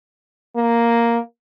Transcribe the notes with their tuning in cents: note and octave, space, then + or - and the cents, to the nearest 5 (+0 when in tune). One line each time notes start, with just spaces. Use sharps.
A#3 +0